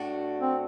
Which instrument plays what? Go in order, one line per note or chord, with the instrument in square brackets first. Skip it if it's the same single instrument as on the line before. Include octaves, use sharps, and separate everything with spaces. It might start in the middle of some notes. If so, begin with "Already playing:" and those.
Already playing: [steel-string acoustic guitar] A2 A3 D4 F#4
[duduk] C4